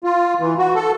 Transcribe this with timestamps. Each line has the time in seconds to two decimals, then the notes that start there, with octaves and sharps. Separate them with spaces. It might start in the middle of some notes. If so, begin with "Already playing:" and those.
0.04 F4
0.40 E3
0.58 F#4
0.75 A4